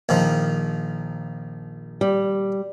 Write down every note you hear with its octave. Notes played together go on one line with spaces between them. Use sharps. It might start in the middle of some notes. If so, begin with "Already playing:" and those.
A#1 D#3 F3
G3